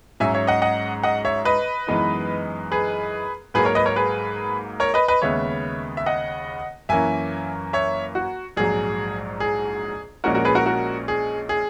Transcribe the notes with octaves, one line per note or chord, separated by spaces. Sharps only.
G#2 F#3 C#4 E5 G#5
C#5 E5
D#5 F#5
D#5 F#5
D#5 F#5
C#5 E5
B4 D#5
F#2 E3 G#3 B3 D#4
G#4 B4
G#2 F#3 A#3 G#4 B4
A#4 C#5
B4 D#5
A#4 C#5
G#4 B4
A#4 C#5
B4 D#5
B4 D#5
D#2 C#3 G#3 B3 C#5 E5
E5
D#5 F#5
F#2 E3 A#3 C#4 E5 G#5
C#5 E5
F#4
A#1 G#2 F#3 G#4
G#4
A#1 A#2 G#3 C#4 F#4 A#4
F#4 A#4
G#4 B4
F#4 A#4
F#4 A#4
G#4
G#4